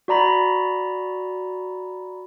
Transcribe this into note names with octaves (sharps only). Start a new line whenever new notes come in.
F#4 D5 A#5 B5